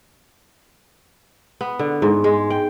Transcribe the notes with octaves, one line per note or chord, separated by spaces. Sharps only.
B3
D3
G#2
G#3
G5